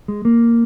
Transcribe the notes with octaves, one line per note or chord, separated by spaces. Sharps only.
G#3
A#3